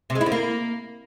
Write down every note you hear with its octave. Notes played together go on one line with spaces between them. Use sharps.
C3
G#3
E4
D3
A#3